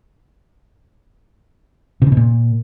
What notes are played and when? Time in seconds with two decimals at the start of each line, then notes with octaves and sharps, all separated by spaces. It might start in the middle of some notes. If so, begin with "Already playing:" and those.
2.02 C3
2.07 C#3
2.12 B2
2.17 A#2